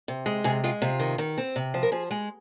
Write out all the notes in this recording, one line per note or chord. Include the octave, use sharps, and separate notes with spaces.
C3
G#3
C3 G#4
G#3 F4
C3 F4
D#3
D#3
C4
C3
F3
A#4
F3 G#4
G#3